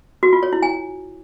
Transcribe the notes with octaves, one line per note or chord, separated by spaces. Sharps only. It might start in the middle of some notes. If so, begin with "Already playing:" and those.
F#4
F4
C#5
E4
G#5